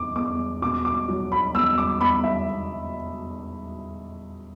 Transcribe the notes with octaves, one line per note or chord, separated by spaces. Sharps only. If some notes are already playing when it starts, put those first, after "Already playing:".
Already playing: E2 D6
E2 D6
B2 D6
D6
F#3
B5
E2 E6
D6
E2 B5
E5